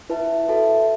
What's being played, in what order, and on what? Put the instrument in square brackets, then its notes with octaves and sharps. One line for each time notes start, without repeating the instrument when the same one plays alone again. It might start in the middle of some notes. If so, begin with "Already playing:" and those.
[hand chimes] E4 B4 E5 A5
F#4 A4 E5 A5